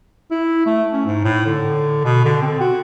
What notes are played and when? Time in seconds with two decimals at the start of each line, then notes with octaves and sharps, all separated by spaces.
0.31 E4
0.66 A3
0.93 C#4
1.06 G#2
1.24 A2
1.46 D3
2.05 B2
2.25 D3
2.42 C4
2.60 F#4